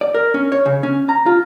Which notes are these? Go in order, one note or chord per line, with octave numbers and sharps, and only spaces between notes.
D5
A#4
C#4
C#5
C#3
C#4
A#5
F4